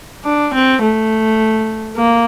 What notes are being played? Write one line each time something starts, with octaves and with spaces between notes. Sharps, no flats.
D4
C4
A3
A#3